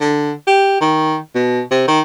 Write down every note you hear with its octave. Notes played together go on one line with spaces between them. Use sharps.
D3
G4
D#3
B2
C3
D#3